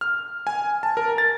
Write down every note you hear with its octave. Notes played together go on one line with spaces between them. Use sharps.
F6
G#5
A5
A#4
A6